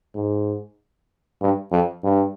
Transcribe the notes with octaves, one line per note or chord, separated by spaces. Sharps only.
G#2
G2
F2
G2